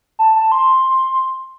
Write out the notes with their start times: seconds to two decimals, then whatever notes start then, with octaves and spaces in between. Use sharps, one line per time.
0.19 A5
0.36 A5
0.52 C6